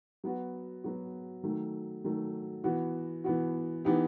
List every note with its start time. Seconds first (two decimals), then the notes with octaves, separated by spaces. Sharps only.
0.24 F#3 B3 F#4
0.84 F#3 B3 F#4
1.43 D#3 F#3 A3
2.04 D#3 F#3 A3
2.64 E3 B3 F#4
3.24 E3 B3 F#4
3.85 E3 B3 D#4 G4